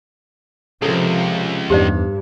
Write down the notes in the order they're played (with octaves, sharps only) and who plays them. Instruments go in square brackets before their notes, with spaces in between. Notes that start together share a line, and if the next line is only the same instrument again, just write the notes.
[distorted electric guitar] C#2 [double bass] C3 F3 [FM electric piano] C#4 [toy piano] A4 A#4
[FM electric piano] E2 B3 D#4 [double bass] G2 [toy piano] G4 C5 D5